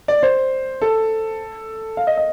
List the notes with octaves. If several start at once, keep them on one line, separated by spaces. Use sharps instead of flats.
D5
C5
A4
F5
D#5
D#5